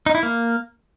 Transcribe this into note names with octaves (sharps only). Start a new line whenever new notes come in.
D#4
E4
A#3